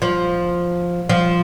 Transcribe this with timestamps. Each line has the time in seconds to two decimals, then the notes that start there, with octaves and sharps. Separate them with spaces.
0.02 F3
1.09 F3